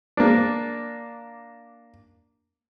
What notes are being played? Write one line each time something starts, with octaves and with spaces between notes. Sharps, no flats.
A#3 D4